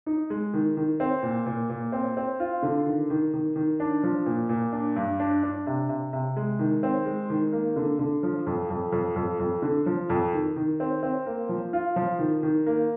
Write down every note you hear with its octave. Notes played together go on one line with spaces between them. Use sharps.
D#4
G#3
D#3
D#3
C4
A#2
A#2
A#2
C4
C4
F4
D3
D#3
D#3
D#3
D#3
D4
F3
A#2
A#2
D4
G2
D4
D4
C3
C3
C3
G#3
D#3
C4
G#3
D#3
A#3
D3
D3
F3
F2
F2
F2
F2
F2
D3
F3
F2
D#3
D#3
C4
C4
A#3
F3
F4
F3
D#3
D#3
A#3